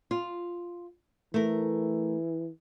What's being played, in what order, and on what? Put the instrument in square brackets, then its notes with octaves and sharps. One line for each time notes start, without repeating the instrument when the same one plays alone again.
[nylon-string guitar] F4
[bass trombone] E3 [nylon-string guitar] A3 A#4